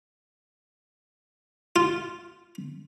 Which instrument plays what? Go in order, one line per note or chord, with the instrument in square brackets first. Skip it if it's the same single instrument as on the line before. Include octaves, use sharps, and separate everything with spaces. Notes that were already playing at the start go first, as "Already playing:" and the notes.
[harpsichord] F4